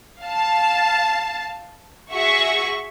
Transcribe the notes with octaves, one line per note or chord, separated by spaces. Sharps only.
F5 A5
F#4 G#4 E5 C#6